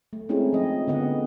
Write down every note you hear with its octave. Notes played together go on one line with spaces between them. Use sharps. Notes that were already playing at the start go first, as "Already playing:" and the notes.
A3
G#3 C4 C#4 D#4 E4 G#4
F3 D#5
D3 B3 D#5 F#5